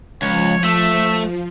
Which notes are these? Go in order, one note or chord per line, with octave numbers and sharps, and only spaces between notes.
C#2 F3 C#5
A3 E5